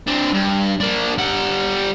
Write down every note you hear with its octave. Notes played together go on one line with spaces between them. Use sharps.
C4 D4
G2
A#3 D4
G3 F#5